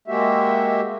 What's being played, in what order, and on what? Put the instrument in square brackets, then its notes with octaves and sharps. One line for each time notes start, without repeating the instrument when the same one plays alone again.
[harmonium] G#3 A#3 F#4 G4 E5